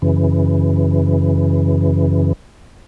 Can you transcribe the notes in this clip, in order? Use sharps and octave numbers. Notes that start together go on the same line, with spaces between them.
F#2 C#3 E3